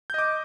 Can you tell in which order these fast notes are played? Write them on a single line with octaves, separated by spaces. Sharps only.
G6 D#5 D6